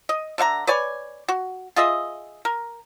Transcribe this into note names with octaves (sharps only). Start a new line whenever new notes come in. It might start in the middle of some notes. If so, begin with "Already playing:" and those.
D#5
D3 E5 F5 A#5
B4 C#5 D5 G#5
F#4
F4 G#4 D#5 E5
A#4